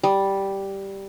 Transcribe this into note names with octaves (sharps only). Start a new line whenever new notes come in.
G3